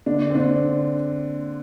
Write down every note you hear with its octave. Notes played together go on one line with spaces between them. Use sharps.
D3 D4
C4
D3 D4